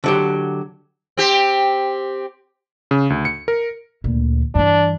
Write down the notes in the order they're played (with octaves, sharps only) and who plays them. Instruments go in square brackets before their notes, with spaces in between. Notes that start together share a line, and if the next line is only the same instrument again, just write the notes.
[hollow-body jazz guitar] D3 F#3 G4
[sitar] C4 G4
[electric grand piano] C#3
D2
C#7
A#4
[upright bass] D2 A#2
[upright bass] G2 E3 [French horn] D4